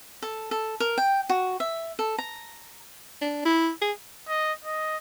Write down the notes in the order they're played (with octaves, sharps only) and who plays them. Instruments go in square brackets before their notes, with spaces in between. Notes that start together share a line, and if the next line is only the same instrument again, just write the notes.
[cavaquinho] A4
A4
A#4
G5
F#4
E5
A4
A#5
[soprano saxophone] D4
E4
G#4
[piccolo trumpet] D#5
D#5